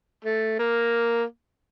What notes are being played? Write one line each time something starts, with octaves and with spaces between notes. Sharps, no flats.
A3
A#3